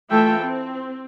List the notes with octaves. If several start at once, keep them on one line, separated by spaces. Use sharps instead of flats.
E3 A3 F4 A4 E5 G5
C4